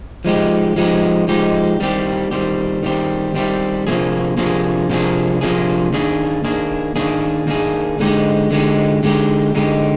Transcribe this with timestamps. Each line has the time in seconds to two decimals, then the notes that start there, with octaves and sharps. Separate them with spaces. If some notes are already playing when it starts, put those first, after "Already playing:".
0.25 F3 G#3 D#4 G4
0.76 F3 G#3 D#4 G4
1.28 F3 G#3 D#4 G4
1.80 D#3 G3 C4 G4
2.31 D#3 G3 C4 G4
2.83 D#3 G3 C4 G4
3.35 D#3 G3 C4 G4
3.87 C3 F3 A#3 D4 G#4
4.37 C3 F3 A#3 D4 G#4
4.90 C3 F3 A#3 D4 G#4
5.41 C3 F3 A#3 D4 G#4
5.92 D#3 A#3 D4 G#4
6.44 D#3 A#3 D4 G#4
6.96 D#3 A#3 D4 G#4
7.47 D#3 A#3 D4 G#4
7.99 D3 G#3 D#4 G4
8.51 D3 G#3 D#4 G4
9.03 D3 G#3 D#4 G4
9.55 D3 G#3 D#4 G4